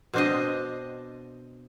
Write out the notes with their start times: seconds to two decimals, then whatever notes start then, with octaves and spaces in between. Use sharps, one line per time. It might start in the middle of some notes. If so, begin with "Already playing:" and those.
0.14 B2 C4 D4 C5 D#5